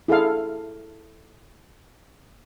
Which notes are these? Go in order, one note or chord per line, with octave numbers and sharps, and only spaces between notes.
E4 G#4 A4 F5